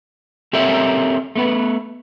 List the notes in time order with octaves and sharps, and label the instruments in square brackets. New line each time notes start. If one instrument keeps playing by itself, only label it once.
[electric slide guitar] C4 G4 A4 A#4 C#5 E5
A3 B3 B4